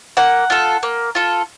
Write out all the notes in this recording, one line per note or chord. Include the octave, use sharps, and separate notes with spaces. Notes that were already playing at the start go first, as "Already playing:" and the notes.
A#3 F#5
F4 A4
A#3
F4 A4